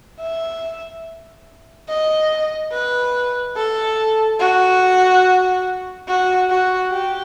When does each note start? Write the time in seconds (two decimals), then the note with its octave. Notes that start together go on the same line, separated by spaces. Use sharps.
0.20 E5
1.89 D#5
2.73 B4
3.57 A4
4.40 F#4
6.08 F#4
6.50 F#4
6.91 G4